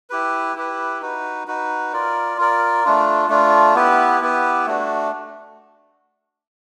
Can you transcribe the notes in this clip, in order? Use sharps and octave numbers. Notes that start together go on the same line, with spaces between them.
E4 G4 B4
E4 G4 B4
D#4 F#4 B4
D#4 F#4 B4
F4 A#4 D5
F4 A#4 D5
A3 D4 F4
A3 D4 F4
B3 E4 G4 B4
B3 E4 G4 B4
A3 D4 F#4